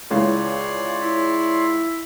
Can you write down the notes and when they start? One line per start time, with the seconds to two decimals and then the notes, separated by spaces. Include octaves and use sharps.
0.11 C#2 C#3 E3 C#5 D5 C6
1.02 E4